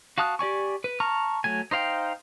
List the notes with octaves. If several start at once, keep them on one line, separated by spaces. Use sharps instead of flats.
F#4 F5 A5 D#6 F#6
G4 D5 G#5 C#6
B4
A5 A#5 C#6 F6
F#3 A3 G#5
D#4 C5 F5 G5